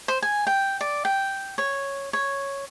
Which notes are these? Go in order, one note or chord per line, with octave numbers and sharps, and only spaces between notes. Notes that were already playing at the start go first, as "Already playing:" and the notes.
C5
G#5
G5
D5
G5
C#5
C#5